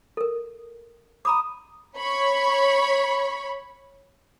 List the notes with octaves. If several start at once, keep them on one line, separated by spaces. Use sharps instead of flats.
A4 A#4
A#5 B5 D6 D#6
C#5 B5 C#6